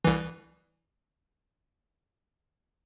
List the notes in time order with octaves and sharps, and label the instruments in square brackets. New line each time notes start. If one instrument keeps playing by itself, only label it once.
[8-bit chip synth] C2 E3